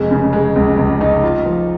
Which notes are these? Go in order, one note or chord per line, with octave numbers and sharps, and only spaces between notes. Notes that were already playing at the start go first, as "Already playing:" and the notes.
Already playing: F1 G#3
C#3
G#3
C#2
C#2
D#4
F4
F3